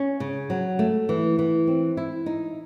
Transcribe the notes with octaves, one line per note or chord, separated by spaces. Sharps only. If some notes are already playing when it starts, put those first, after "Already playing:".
Already playing: C#4
C#3
F#3
A3
E3
E3
C4
E4
D#4